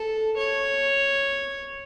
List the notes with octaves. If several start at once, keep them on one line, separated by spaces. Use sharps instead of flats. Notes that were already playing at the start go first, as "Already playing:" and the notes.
Already playing: A4
C#5